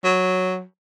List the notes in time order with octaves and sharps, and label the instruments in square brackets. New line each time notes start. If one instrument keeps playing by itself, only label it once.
[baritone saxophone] F#3